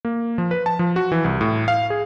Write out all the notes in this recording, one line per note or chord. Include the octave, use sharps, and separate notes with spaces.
A#3
F3
B4
A5
F3
F#4
E3
C2
A2
F5
G#4